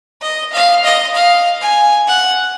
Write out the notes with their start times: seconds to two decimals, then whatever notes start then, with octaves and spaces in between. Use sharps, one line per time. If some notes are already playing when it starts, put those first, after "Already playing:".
0.22 D#5
0.53 F5
0.84 D#5
1.14 F5
1.62 G#5
2.08 F#5